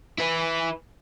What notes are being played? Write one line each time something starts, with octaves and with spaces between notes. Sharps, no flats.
E4 B4